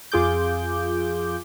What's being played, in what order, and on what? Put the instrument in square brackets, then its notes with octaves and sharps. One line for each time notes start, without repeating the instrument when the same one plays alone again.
[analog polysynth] F2 F4 G#4 D6 G6